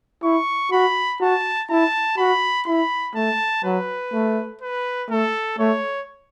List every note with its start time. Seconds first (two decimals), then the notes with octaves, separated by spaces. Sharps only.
0.23 E4 C#6
0.72 F#4 B5
1.21 F#4 A5
1.70 E4 A5
2.17 F#4 B5
2.66 E4 B5
3.15 A3 A5
3.64 F#3 B4
4.13 A3
4.61 B4
5.10 A3 A4
5.59 A3 C#5